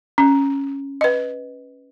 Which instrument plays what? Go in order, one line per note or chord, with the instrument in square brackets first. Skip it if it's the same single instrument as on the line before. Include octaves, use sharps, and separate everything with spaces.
[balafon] C#4
B4 D#5